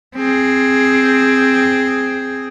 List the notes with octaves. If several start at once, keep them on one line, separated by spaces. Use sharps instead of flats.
C4 G#4